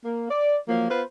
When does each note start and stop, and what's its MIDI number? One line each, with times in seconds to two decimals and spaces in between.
0.05 0.28 58
0.30 0.57 74
0.68 0.87 53
0.68 0.87 54
0.68 0.87 58
0.90 1.02 59
0.90 1.02 65
0.90 1.02 71
0.90 1.02 72